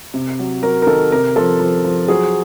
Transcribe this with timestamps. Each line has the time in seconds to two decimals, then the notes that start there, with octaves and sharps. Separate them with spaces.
0.14 C3
0.39 F#3
0.62 F#3 A#4
0.82 A#4
0.87 D#3 A4
1.12 C3 A#4
1.36 F3 A4
1.60 F3
1.85 F3
2.08 F#3 G#4